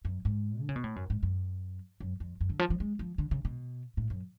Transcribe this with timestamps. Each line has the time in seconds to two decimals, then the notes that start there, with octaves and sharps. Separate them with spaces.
0.05 F#2
0.25 G#2
0.61 D3
0.69 C#3
0.76 B2
0.84 A2
0.96 F#2
1.10 G#2
1.23 F#2
2.00 F#2
2.20 F2
2.41 F#2
2.50 D3
2.59 F3
2.70 F3
2.80 G#3
2.99 F3
3.18 D3
3.31 C#3
3.45 B2
3.97 A2
4.10 F#2